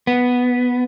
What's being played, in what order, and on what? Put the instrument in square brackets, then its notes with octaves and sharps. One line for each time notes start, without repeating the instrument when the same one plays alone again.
[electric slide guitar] B3